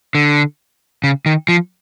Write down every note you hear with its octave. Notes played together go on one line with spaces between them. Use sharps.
D3
C#3
D#3
F3